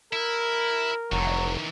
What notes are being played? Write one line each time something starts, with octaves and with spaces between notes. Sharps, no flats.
E4 A#4
F1 D#3 E3 F#3